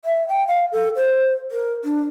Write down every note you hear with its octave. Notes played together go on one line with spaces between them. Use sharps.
E5
G5
F5
A4
C5
A#4
D4